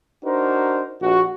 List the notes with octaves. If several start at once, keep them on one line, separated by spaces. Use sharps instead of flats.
D4 D#4 F#4 A#4 C5
A#1 F#4